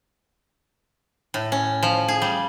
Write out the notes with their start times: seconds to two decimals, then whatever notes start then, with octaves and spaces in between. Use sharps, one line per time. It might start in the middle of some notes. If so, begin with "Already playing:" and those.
1.34 A2
1.52 C#4
1.83 F3
2.08 G#4
2.22 G3